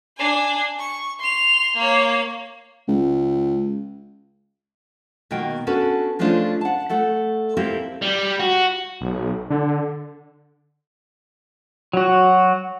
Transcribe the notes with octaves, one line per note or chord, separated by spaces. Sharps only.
D4 G#5
C#6
C6 F7
A#3 C#5
C#2
B2 D#3 A#3 G5
C#4 D4 F#4 A4 B4
F3 G#3 A3 C#4 D4 F4
F#5 A5
A3 A4 F#5
A#3 C4 E4 G4 A4
G3
F#4
B1
D3
F#3 F#4